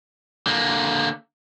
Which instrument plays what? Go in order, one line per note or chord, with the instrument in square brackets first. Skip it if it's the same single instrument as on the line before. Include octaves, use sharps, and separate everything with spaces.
[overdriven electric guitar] D3 A#3